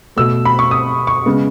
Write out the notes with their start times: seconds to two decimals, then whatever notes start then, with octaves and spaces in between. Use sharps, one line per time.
0.16 B2 A3 E6
0.45 B5
0.59 C#6
0.71 D#6
1.07 C#6
1.26 C#3 G#3 B3